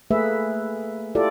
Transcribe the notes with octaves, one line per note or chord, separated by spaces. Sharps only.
A3 A#3 G#4 B4 E5
E4 F4 G4 A4 D5